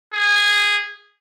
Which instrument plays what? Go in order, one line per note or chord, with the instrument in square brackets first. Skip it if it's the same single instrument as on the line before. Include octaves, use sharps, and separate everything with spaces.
[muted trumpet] G#4